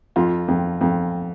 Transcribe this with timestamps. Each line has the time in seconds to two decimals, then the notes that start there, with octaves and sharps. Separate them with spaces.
0.16 F2 F4
0.48 F2
0.81 F2